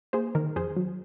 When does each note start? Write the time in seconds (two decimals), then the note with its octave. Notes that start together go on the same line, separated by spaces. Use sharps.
0.13 A#3 G#4 C5
0.35 D#3 A#4
0.56 F2 G#4 C5
0.77 F#3